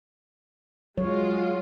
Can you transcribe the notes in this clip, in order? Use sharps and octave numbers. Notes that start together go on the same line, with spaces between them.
F#3 G#3 F4 C#5